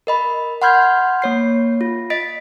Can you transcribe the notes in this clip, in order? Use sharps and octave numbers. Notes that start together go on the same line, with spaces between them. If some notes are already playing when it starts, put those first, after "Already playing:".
A#4 D#5 B5
F#5 B5 C6 F6 G6 G#6
A#3 C#5 C7
F4
D#5 A6 B6 D7